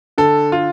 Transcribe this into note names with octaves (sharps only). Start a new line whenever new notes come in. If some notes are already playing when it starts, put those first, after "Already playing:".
D3 A4
F4